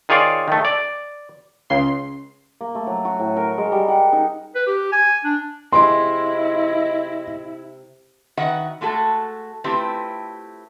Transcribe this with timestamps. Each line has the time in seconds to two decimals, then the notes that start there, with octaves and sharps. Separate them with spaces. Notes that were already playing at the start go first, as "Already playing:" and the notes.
0.09 D#3 F4 G#4 C#5 D5
0.48 D#3 A3
0.65 D5
1.70 C#2 C#3 C6 C7
2.61 A#3
2.75 A3
2.87 F#3
3.05 F#4
3.20 A2
3.37 A#4
3.58 G#3
3.72 G3
3.88 F#5
4.13 D#4
4.55 B4
4.67 G4
4.92 G#5
5.24 D4
5.72 C3 G#3 E4 D#5 C6 D6
8.37 D#3 F#4 B4 E5 F#5
8.81 G#3 A3 F#4 A4
9.64 A3 C4 E4 F4 G4 B4